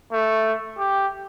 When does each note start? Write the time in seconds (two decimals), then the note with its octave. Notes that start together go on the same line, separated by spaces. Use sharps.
0.12 A3
0.78 G4